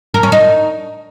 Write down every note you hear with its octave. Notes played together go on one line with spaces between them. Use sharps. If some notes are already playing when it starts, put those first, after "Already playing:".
A#4
C#4
D#4